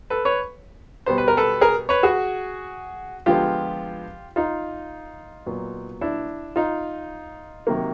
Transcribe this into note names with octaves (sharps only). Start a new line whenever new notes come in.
A4 B4
B4 C#5
B2 G3 B3 C5
B4
A#4
A4 B4
G#4 A#4
B4 C#5
F#4 G#4
D3 F3 G#3 B3 F4 G4
D#4 F4
A#2 F#3 B3
D4 E4
D#4 F4
C3 D#3 F#3 A#3